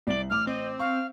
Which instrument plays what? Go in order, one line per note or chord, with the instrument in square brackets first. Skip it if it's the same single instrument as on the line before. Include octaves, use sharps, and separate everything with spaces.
[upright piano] C2 F#7 [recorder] D5
[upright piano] A1 D6 [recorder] F6
[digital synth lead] C4 [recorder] D#5
[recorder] F5 [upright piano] C#6